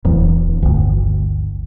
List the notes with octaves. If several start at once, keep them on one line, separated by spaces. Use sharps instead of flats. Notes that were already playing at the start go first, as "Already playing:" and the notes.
D1 E2
G1 D2